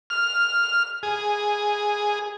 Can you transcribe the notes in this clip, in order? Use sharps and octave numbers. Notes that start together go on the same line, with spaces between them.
F6
G#4